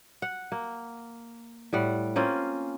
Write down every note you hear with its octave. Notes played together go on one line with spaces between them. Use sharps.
F#5
A#3
A2 G3 F#5
A#3 C4 C#4 F4